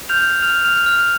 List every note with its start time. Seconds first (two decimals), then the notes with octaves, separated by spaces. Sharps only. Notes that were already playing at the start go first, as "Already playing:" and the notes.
0.09 F6 G6 F7
0.42 F6 F7
0.65 F6 F7
0.76 F6
0.86 F6 F7